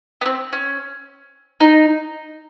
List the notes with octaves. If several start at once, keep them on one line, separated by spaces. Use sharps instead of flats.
B3
C4
C#4
D#4